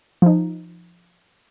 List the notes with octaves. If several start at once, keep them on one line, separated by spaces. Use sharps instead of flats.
F3 D#4